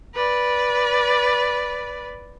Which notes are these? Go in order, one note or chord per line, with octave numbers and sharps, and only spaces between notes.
B4 D5